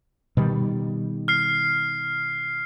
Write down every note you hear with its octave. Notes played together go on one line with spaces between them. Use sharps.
B2 D#3 G3
F6 C7